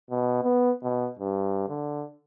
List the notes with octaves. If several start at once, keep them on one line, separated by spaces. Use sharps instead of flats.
B2
B3
B2
G2
D3